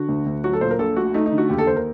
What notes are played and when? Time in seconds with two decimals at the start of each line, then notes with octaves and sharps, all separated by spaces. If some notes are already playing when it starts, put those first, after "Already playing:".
Already playing: D3 F#4
0.08 D2
0.26 D2
0.44 F#3 F#4
0.53 A4
0.61 A#2 C5
0.71 A#4
0.79 A#1 A4
0.97 A3 F#4
1.14 A3 D#4
1.26 D#4
1.32 D3
1.38 F#4
1.49 D#2 G4
1.58 A4
1.67 D#2 C5
1.76 A#4